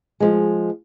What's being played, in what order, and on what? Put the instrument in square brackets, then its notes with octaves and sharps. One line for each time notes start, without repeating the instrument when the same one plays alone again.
[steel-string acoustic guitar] F3 G#3